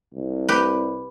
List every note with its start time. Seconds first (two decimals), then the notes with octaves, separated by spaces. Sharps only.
0.14 C2
0.49 G4 B4